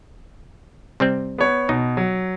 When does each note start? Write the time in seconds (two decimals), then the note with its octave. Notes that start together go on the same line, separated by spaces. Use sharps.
1.00 C3 G3 C4
1.38 B3 C#5
1.69 B2 D#4
1.97 F#3